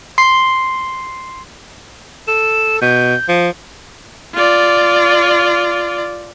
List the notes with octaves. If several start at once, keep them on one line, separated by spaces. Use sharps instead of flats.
C6 C7
A4 E7
B2 G6
F3
F4 D5